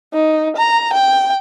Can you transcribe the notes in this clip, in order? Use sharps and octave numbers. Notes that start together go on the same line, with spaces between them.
D#4
A#5
G5